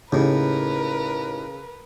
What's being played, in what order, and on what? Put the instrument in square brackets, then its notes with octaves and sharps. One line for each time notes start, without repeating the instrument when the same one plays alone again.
[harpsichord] D#2 A2 [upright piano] C#3 [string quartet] A#4 B4